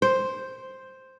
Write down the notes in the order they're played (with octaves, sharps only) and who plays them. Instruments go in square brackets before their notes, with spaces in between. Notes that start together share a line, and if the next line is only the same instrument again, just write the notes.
[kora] C5